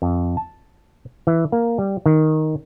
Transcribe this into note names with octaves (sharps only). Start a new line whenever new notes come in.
F2
A5
E3
A#3
G3
D#3